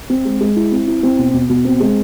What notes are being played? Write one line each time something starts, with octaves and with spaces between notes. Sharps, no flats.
C4
G#3
G#3
E4
C4
E4
C4
B2
B2
B2
C4
G#3